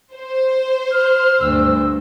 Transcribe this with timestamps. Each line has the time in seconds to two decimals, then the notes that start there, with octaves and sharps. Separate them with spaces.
0.14 C5
0.91 F6
1.40 D2 G2 E6